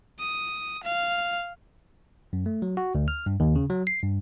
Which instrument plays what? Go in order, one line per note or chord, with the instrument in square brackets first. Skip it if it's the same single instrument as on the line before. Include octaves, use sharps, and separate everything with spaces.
[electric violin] D#6
F5
[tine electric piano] F#2
A3
F#3
F#4
D2
F6
G2
D#2
C#3
F#3
C7
G2